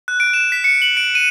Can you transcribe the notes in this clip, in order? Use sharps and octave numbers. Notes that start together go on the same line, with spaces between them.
F#6
D7
E7
B6
C#7
F#7
D7
D#7